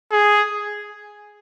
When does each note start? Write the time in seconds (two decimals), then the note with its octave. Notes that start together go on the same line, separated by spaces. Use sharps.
0.12 G#4